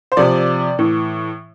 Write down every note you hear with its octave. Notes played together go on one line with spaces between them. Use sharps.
C5
C3 F3 D5
A2 E3